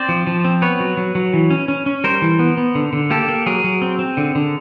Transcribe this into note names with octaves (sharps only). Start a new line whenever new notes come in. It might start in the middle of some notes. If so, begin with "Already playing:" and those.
Already playing: C4 C5 D5
F3
F3
C4
B3 B4 C#5
F#3
F#3
F#3
E3
C#4
C#4
C#4
G3 A#4 C5
E3
B3
B3
D3
D3
A#3 G4 A4
A#3
F#3 G#4 A#4
F#3
C4
C4
D3
D3